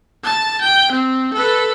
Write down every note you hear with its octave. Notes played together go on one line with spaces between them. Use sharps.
A5
G5
C4
A4 B4